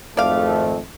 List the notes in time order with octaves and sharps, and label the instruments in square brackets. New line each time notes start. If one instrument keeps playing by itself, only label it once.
[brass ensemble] G#1 F2 A3 [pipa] D5 F5